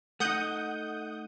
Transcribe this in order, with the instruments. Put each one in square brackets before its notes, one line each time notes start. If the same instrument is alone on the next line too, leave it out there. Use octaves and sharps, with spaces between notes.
[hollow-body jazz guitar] A3 D#4 [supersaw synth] F#5 D#6 G6